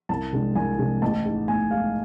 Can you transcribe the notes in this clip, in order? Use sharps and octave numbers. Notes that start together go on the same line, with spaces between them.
C2 A5
C3 G#3 D4
C2 G#5
C3 G#3 D4
A1 A5
G#2 G#3
A1 G#5
G#2 G#3 F5